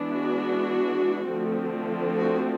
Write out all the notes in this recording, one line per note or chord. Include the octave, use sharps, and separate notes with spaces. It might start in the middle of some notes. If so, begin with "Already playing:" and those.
Already playing: E3 G#3 B3 D4
F#4
D3 F3 A3 C4
F#4